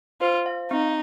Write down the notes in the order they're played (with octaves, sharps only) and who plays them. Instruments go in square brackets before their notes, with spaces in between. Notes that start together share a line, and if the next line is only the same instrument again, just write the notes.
[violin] F4 [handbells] C5
[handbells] F5
[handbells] C4 [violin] D#4